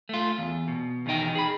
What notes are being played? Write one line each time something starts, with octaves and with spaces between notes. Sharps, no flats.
A3 F4
E2
B2
E2 B2 D#3 D#4 G5
G#4 B5